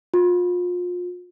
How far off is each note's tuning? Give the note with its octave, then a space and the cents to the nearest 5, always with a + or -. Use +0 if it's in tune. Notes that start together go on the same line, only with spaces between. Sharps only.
F4 +35